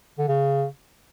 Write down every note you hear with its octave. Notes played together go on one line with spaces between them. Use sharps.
D3
C#3